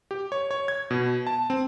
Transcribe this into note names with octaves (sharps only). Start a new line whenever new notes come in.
G4
C#5
C#5
G#6
B2
A5
C4